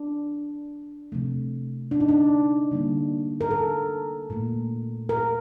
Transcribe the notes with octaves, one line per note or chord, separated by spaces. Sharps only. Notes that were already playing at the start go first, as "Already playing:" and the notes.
Already playing: D4
C3 F3 A3
D4
D#4
D4
D3 G3 A#3
A#4
A4
A#2 A3
A#4